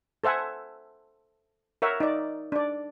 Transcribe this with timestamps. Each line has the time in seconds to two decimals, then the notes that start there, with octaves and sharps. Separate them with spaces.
0.24 A4 C5 E5 F#5 G#5
1.82 A#4 C#5 E5 F#5
2.00 D#4 D5
2.52 D4 D5